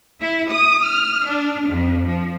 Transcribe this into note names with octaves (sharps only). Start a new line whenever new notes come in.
E4
D#6
F6
D4
F2
F3